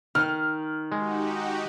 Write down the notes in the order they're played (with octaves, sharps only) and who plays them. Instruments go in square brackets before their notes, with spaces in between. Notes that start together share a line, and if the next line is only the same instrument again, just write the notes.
[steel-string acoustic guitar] D#3 [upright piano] F6
[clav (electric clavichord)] G#3 [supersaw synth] D#4 F#4 G4